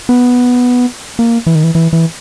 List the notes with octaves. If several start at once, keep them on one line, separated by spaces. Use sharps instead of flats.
B3
A#3
E3
D#3
E3
E3
E3